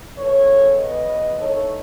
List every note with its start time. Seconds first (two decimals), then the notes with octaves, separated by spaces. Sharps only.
0.18 C#3 E3 B3 A4 C#5
0.78 B4 D#5
1.37 E3 A3 D#4 A4 C#5